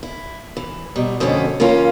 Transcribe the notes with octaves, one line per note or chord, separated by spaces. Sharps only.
E4
E3
B2 F#3 G3
F2 B2 D3 A3 C4 C#4
C#3 E3 A#3 C#4 F4